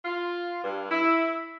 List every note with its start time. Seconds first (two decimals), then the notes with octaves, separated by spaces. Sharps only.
0.05 F4
0.63 G2
0.89 E4